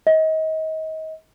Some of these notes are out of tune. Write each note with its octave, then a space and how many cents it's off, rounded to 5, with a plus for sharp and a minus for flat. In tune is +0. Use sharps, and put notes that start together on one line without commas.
D#5 +30